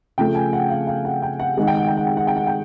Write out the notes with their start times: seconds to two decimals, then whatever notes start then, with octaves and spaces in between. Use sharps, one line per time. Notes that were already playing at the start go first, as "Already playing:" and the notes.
0.18 C#3 F3 A3 G5
0.35 G#5
0.53 F#5
0.70 F5
0.87 F5
1.05 F#5
1.22 G5
1.40 F#5
1.57 D#3 G#3 F#5
1.67 G5
1.77 F#5
1.87 G5
1.97 F#5
2.07 G5
2.17 F#5
2.27 G5
2.36 F#5
2.47 G5